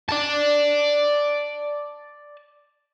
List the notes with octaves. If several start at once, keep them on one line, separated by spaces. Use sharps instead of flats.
D5 A5